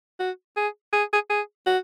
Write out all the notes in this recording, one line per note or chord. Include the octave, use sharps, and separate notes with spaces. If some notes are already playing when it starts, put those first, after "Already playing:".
F#4
G#4
G#4
G#4
G#4
F#4